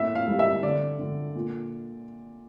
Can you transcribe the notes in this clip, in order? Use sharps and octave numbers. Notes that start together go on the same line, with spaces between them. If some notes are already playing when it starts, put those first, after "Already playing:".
Already playing: A2 A#3 E5
F5
G3
E5
D3 D5
D3
A#2